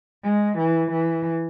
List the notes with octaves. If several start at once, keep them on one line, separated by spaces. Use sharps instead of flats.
G#3
E3
E3